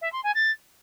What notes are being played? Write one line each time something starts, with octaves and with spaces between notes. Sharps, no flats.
E5
C6
G#5
A6